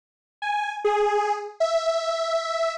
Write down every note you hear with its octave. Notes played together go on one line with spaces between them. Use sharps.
G#5
G#4
E5